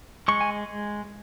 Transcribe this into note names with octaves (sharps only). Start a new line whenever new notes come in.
G#3 C#6
G#5